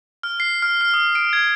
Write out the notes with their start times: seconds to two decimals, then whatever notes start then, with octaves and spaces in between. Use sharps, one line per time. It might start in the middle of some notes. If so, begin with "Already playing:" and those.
0.23 F6
0.40 C7
0.62 F6
0.81 F6
0.94 D#6
1.15 D7
1.33 G#6